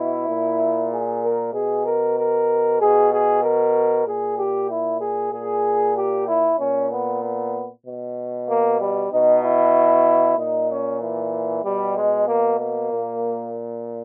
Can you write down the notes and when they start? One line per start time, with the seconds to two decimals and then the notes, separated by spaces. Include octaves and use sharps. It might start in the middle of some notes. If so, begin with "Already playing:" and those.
Already playing: B2 E4
0.28 A#2
0.91 G#4
1.23 A#4
1.54 B2 G#4
1.86 A#4
2.18 A#4
2.80 B2 G#4
3.13 G#4
3.43 A#4
4.06 A#2 G#4
4.39 G4
4.70 E4
5.01 G#4
5.33 A#2 G#4
5.96 G4
6.28 E4
6.59 A#2 C#4
6.91 B3
7.23 B3
7.86 B2
8.49 A#3
8.81 G3
9.12 B2 D#4
9.44 E4
10.38 A#2 D#4
10.70 C#4
11.02 E3
11.64 B2 G3
11.97 G#3
12.28 A#3
12.60 A#3
12.91 A#2